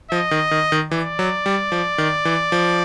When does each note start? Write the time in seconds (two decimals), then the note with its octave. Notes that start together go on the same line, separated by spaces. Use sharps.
0.11 F3 D#5
0.31 D#3
0.51 D#3
0.72 D#3
0.91 E3 D5
1.19 F#3
1.46 G3
1.72 F3
1.98 D#3
2.25 E3
2.52 F3